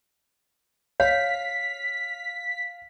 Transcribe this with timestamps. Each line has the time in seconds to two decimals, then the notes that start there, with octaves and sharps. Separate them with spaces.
1.00 C#5 F5 B6